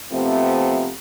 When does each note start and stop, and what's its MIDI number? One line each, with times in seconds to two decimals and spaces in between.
0.12 0.91 48
0.12 0.91 53
0.12 0.91 57
0.12 0.91 59
0.12 0.91 60